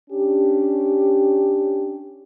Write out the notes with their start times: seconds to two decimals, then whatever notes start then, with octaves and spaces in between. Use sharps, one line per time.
0.10 C#4 D4 G4